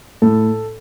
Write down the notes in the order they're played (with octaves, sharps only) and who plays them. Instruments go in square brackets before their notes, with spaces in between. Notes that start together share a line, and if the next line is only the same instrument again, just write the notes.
[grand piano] A2 A4